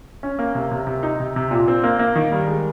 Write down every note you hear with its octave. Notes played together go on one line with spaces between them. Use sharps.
C#4
A#3
C3
C3
C3
D#4
C3
C3
A#2
C4
A#3
A#3
D#3
G3
G#3